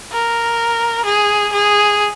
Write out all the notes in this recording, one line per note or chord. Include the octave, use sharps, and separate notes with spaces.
A#4
G#4
G#4